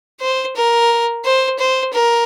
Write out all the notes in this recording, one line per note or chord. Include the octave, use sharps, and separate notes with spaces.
C5
A#4
C5
C5
A#4